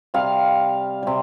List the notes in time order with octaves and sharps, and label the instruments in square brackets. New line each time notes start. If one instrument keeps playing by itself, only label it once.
[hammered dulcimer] C3 G3 F5
C3 G3